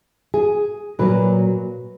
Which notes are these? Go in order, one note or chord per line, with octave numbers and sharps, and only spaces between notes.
G#4
A#2 F#3 A#3 B4